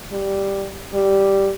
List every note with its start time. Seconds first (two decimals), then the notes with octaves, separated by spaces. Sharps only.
0.12 G3
0.94 G3